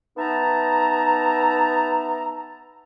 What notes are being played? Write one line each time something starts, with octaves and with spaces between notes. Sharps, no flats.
B3 D#4 E5 A5 A#5